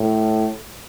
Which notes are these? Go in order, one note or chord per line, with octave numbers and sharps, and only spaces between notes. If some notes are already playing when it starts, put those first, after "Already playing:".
Already playing: A2